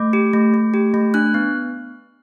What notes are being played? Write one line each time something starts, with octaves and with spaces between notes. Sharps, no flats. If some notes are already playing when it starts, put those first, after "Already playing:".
Already playing: A3 D6
G4
A3
A3
G4
A3
D4 F#6
B3